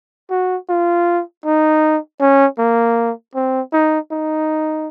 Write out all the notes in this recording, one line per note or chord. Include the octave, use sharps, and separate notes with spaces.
F#4
F4
D#4
C#4
A#3
C4
D#4
D#4